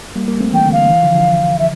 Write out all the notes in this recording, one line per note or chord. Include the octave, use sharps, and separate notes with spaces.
G3 A#3
G3 A#3
A3 C4
E3 G5
D3
F5
D3
E3
D3 F3
D3 F3
E5